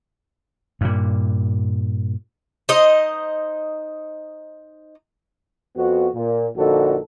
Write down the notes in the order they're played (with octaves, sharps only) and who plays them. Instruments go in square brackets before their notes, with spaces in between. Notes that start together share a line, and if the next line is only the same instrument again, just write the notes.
[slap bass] G2 A#2
[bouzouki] D#4 C5 D#5
[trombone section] F2 B3 F#4
A#2
A#1 D3 D#4 F#4 A4